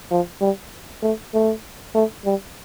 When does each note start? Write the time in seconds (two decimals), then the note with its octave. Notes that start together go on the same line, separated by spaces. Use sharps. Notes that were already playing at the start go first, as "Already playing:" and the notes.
0.11 F3
0.41 G3
1.03 A3
1.34 A3
1.95 A3
2.25 G3